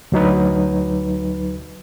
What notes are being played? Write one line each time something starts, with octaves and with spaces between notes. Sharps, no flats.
D2 F#3 D#4 B4